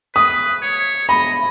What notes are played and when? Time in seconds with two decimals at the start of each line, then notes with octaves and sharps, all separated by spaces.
0.15 B4 D#6
0.62 C#5
1.09 D#5 B5